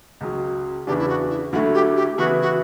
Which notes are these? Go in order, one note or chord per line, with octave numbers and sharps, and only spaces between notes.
C#2 C#3 F#3
E2 C#3 E3 B3 D4 G4
E4
F#4
E4
D2 D3 F#3 A3 E4 F#4
G4
G4
C#3 E3 B3 E4 F#4
F#4